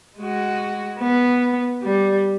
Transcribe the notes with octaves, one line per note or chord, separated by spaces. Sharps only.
G#3 F#4
B3
G3